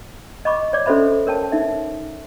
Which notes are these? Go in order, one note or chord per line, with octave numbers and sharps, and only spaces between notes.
D#5 B5 C#6 D6
C#5 D5 D6
C#4 F#4 A4 C5 E5 B5
A#4 C#5 G5 A5
D#4 E5